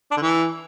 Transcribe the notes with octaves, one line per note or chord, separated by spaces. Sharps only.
D4
D3
E3